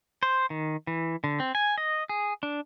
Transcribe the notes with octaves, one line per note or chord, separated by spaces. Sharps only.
C5
D#3
E3
D3
C4
G#5
D#5
G#4
D4